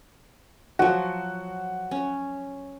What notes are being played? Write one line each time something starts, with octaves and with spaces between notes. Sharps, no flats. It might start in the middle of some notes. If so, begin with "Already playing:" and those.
F3 F#3 F#4
C#4